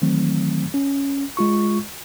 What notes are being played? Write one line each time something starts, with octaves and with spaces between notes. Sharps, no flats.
D#3 E3 F#3 A3 C4
C#4
G#3 F4 C#6